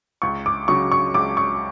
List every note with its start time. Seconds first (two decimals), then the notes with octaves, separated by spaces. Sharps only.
0.22 C#2 C#6
0.46 D6
0.68 C#3 F#3 C#6
0.92 C#6
1.14 C#2 D6
1.37 C#6